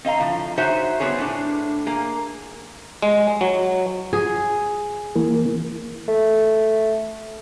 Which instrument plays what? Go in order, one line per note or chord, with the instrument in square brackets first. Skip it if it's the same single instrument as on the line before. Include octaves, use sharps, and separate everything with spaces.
[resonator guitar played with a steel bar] C4 D#5 F5 A#5
A2 D#3 F3
D#4 F#4 G#4 C5 C#5 E5
G3 G#3 B3 C4 G#4 C#5
A2 D4
A#3 G#4
[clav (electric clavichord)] G#3
F#3
[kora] G#4
[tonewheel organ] E3 A#3
[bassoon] A3